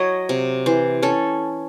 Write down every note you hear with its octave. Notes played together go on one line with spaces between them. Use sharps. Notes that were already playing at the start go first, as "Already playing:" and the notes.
Already playing: F#3 C#5 D#5
C3
E3 C5
C#4 A4